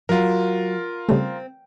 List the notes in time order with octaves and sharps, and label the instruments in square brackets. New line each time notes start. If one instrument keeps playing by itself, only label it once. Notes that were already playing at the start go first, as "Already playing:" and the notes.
[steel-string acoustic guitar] F#3 [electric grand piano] F4 A#4
[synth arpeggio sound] C#3 G3 A3 [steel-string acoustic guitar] C4